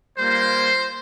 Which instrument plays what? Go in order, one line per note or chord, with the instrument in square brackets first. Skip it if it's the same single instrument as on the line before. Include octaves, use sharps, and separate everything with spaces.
[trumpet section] G3 A#3 F4 C5